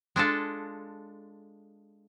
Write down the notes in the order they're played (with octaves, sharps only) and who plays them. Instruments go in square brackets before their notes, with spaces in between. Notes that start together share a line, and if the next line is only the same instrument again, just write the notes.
[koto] G#3 D4 F4 A4